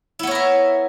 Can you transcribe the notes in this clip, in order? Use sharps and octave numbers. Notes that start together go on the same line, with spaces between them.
B3 E4 A#4 C#5 E5